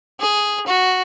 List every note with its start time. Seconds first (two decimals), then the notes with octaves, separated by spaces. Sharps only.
0.20 G#4
0.66 F#4